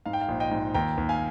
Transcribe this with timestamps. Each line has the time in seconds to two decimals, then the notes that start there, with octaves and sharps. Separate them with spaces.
0.06 G#2 F5
0.13 G5
0.21 F5
0.28 A#1
0.40 D#5 G5
0.51 G#2
0.74 D#2 G5 A#5
0.98 D#2
1.09 F5 G#5